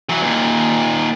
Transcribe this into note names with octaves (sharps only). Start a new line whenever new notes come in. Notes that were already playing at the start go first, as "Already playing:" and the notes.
E3 F#3
D#2 A#2